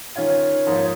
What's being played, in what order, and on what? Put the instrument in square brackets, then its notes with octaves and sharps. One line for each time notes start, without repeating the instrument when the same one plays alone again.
[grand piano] D#3 C#4 F4 [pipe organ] C#5
[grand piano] G#2 F3 A#3 D#4